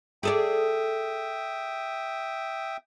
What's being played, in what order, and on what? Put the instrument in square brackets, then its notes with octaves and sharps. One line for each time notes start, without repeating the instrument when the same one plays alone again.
[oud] G#4 A4 D5 [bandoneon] E5 G5 D#6